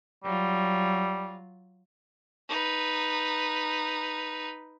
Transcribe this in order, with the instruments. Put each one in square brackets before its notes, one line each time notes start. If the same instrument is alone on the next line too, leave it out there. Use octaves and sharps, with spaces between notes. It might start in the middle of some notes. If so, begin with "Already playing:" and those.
[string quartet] F#3 F4 [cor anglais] G3
[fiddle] D#4 B4